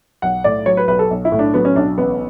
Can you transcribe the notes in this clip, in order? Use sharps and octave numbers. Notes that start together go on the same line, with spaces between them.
B1 F#5
A2 D5
F#3 C#5
B4
B1 B4
A4
B1
E4
A2
D4
F#3 B3
C#4
B1 D4
A1 B3